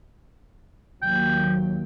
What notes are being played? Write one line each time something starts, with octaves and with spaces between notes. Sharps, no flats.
D#2 F#3 G5